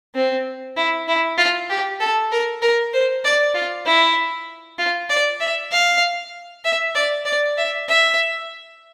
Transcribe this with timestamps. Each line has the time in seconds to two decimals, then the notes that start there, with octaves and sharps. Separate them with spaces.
0.15 C4
0.77 E4
1.08 E4
1.38 F4
1.70 G4
2.00 A4
2.32 A#4
2.62 A#4
2.93 C5
3.25 D5
3.54 F4
3.86 E4
4.79 F4
5.10 D5
5.40 E5
5.72 F5
6.64 E5
6.95 D5
7.26 D5
7.57 E5
7.88 E5